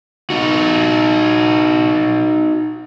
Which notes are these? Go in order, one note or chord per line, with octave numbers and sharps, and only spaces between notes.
D#4 F#4